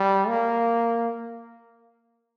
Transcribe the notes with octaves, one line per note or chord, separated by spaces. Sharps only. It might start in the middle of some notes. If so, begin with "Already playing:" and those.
Already playing: G3
A#3